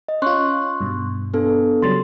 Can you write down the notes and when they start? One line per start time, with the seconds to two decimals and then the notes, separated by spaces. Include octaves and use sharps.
0.08 D#5
0.22 C#4 F4 C6 C#6 F#6
0.81 G2 B2
1.34 B3 D4 A4
1.82 C#3 F#3 G3 C6 A6